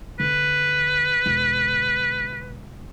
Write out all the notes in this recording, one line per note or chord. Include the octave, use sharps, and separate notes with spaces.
D3 C4 B4
E1 D3